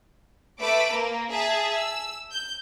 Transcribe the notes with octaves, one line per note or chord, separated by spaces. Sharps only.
A3 B4 D6 E6 D7
A#3
G#4 E5 A5
E6
G6